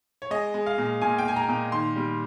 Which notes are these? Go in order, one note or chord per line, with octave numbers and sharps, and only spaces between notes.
C#5
G#3 D#5
G#3
F5
A#2
A#2 G#5
G5
G#3 G#5
A#5
A#2
D#3 C6
G3